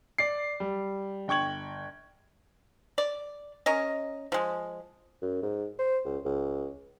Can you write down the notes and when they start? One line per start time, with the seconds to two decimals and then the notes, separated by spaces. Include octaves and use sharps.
0.18 D5 C7
0.60 G3
1.28 G1 G5 C#6 G#6 F#7
2.98 D5
3.66 C#4 A#4 D#5
4.32 F3 G#3
5.22 F#2
5.42 G#2
5.79 C5
6.05 C#2
6.25 C#2